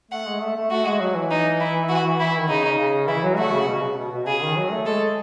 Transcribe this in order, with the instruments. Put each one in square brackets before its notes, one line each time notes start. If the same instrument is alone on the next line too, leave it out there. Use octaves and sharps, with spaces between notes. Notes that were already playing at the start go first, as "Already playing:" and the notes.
[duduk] A3 [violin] F#5
[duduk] G#3
A3
A3
[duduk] A3 [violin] F#4
[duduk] G#3
F#3
E3
[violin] D#4
E4
F#4
E4
[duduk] D#3
[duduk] C#3 [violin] D#4
[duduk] C#3
[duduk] E3 [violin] E4
[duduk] F#3
[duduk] A3 [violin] F#4
[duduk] C#3
B2
C#3
B2
B2
[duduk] C#3 [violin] G#4
[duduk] D#3
F#3
A3
[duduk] G#3 [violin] A4